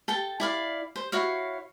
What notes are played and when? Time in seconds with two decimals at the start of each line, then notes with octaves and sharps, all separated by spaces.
0.08 A4 G5 A5
0.40 E4 D5 F5
0.96 C5
1.12 E4 F#4 C#5 F5